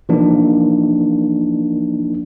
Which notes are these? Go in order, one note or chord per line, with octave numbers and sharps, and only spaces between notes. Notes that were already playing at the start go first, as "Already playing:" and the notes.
E3 F3 A#3 D4 D#4